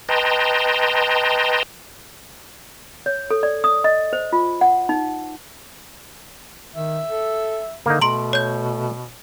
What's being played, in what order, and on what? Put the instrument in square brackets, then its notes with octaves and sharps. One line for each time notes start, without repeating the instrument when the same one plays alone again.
[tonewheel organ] B4 D#5 G5 A5 A#5 C6
[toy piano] C#5
A4
D5
D#6
D#5
C5
F4
F#5
D#4
[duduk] D#3 [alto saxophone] E5
[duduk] A4
[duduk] D3 [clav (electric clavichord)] A#3 D#4
[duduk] B2 [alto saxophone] A3 [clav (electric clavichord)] A#5 [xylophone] C6 D7 F#7
[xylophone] C#5 G6